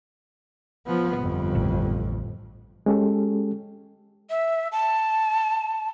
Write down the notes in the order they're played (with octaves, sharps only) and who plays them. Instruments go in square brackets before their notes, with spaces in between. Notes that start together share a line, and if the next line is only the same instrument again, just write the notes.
[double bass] F3 B3
G1 F2
[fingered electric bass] A1
[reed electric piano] G#3 C#4 G4 A4
[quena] E5
A5